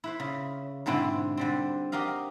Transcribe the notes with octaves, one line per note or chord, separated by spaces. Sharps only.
E4 B4 C5
C#3
G#2 B2 D3 C4 E4
D3 G3 C4
F#4 G4 A#4 D#5 F5